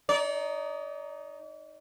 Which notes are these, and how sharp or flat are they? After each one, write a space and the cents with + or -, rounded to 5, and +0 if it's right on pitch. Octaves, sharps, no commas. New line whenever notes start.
D#4 +0 D5 -40